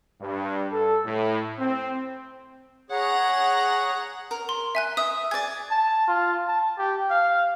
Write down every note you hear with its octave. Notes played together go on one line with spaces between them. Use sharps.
G2
A4
A2
C4
G#4 C#5 F#5 A#5
A#4
C6
E5 G#5 F#6
E5 D#6
G#4 D5 G#6 A6
A5
F4
A5
G4
F5